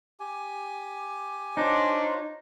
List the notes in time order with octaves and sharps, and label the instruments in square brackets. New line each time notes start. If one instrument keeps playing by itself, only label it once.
[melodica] G4 G#5
[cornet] D4 [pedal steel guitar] D#4 [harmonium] F4 C5 C#5